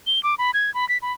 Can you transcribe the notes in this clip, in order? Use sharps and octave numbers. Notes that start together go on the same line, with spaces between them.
G7
D6
B5
G#6
B5
B6
B5